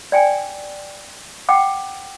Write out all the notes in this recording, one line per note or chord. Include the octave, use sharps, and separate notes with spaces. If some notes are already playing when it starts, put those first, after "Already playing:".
D5 G5 G#5
F#5 G5 D6